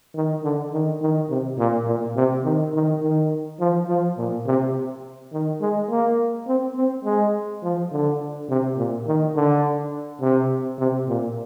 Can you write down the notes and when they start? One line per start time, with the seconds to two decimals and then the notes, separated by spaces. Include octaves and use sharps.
0.15 D#3
0.43 D3
0.73 D#3
1.02 D#3
1.30 C3
1.59 A#2
1.87 A#2
2.16 C3
2.44 D#3
2.74 D#3
3.02 D#3
3.60 F3
3.89 F3
4.18 A#2
4.47 C3
5.33 D#3
5.61 G#3
5.89 A#3
6.47 C4
6.76 C4
7.05 G#3
7.63 F3
7.92 D3
8.50 C3
8.77 A#2
9.07 D#3
9.36 D3
10.21 C3
10.79 C3
11.09 A#2